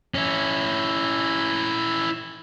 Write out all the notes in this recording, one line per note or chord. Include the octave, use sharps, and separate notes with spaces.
C#4 E4